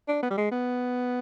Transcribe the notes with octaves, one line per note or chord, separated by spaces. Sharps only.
D4
B3
G3
G#3
B3